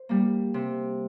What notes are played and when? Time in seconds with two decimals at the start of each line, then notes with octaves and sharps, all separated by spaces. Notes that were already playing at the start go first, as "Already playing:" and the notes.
Already playing: C5
0.09 G3 A#3
0.54 C3